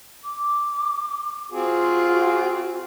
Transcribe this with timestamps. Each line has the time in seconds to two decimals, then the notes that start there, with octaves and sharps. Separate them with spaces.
0.24 D6
1.52 C4 F4 F#4 G#4